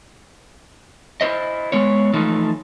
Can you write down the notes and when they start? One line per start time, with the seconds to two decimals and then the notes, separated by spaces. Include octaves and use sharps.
1.21 E4 C5 D#5
1.72 G#3 B3 C#5
2.13 E3 F3 A3 D#4